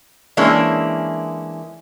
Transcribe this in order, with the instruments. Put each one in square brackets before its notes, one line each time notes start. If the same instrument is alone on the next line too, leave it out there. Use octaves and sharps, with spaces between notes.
[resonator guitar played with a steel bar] E3 G#3 A#3 C#4 D4 E4